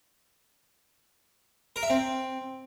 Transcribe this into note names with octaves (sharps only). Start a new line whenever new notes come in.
A#4
E5
C4